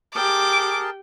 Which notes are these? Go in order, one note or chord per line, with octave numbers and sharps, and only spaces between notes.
G4 G#4 A#4 G5 A5 D6